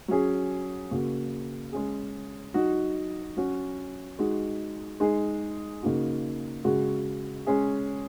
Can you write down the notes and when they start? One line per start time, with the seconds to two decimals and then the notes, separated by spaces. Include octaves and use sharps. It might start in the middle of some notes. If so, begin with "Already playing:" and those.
0.08 F#3 C#4 G#4
0.91 C#3 A#3 F#4
1.73 G#3 C#4 G#4
2.54 F#3 D#4 F#4
3.37 F#3 C#4 F#4
4.19 G#3 D#4 F#4
5.00 G#3 D#4 G#4
5.83 C#3 A#3 D#4 F#4
6.64 C#3 G#3 F#4
7.47 G#3 C#4 G#4